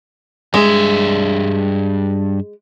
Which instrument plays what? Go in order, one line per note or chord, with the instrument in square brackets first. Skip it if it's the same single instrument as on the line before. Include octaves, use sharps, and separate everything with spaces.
[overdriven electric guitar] G2 E5 [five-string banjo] G#3